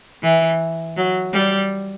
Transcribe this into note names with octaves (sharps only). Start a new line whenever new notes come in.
E3
F#3
G3